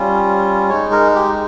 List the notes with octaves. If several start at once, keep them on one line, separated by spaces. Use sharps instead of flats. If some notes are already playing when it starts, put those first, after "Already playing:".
Already playing: G3 C#4 F4
G#3 D#4 C#5
A#4
G4